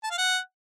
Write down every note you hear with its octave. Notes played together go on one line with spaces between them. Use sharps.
A5
F5
F#5